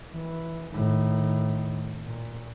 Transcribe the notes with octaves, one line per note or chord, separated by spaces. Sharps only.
E3
A2 D#3
A#2